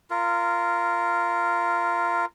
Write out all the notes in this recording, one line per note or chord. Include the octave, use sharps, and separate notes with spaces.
F4 A#4